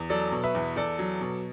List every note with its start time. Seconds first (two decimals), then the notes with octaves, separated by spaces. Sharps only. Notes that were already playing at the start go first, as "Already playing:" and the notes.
Already playing: E2
0.10 F#3 A4 D5
0.32 B2
0.44 B4 E5
0.55 E2
0.76 E2 A4 D5
0.99 F#3
1.21 B2